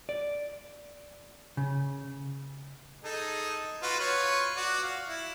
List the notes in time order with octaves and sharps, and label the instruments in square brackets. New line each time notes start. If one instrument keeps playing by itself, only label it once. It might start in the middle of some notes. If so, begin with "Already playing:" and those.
[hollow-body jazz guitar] D5
C#3
[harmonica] D#4 G#4 A4
F4 F#4 B4
F4 B4 C#5
F#4 D5
F5
E4